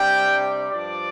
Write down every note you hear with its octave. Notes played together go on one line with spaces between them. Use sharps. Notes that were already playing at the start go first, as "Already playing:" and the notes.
Already playing: C3 G3 D4 G5
G2 F3 D4 D5